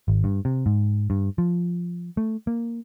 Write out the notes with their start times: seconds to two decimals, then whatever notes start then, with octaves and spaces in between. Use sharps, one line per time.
0.08 G#1
0.24 G2
0.45 C3
0.66 G#2
1.10 G2
1.38 F3
2.17 A3
2.47 A#3